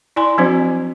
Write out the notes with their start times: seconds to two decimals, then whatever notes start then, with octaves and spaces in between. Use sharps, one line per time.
0.16 E4 D5 G#5 A#5 C6
0.38 F3 F#3 C4 D4 F#4 C5